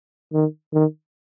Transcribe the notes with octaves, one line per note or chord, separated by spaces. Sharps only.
D#3
D#3